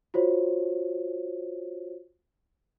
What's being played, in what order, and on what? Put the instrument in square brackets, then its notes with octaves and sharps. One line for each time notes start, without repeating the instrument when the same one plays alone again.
[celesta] F4 F#4 C5 C#5